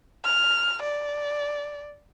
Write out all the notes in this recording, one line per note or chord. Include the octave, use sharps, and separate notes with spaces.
F6
D5